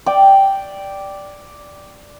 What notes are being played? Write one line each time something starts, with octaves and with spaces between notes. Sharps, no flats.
D5 G5